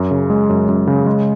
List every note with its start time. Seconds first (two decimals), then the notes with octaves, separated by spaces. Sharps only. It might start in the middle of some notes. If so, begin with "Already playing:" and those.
Already playing: F#2
0.11 C#3
0.30 G#3
0.49 F#2
0.69 F#2
0.87 C#3
1.06 G#3